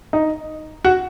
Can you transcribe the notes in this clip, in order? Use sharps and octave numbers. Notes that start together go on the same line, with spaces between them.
D#4
F#4